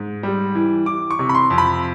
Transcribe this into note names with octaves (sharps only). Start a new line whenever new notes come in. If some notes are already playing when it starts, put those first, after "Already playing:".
Already playing: G#2
G3
E3
E3 D6
C#6
C3
B5
C6
F2
B5